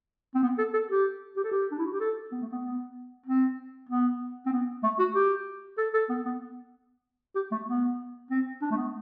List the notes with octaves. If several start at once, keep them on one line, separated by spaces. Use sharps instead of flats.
C4
B3
A4
A4
G4
G4
A4
G4
D4
E4
F#4
G4
A4
B3
A3
B3
B3
C4
B3
C4
B3
A3
F#4
G4
A4
A4
B3
B3
G4
A3
B3
C4
D4
A3
B3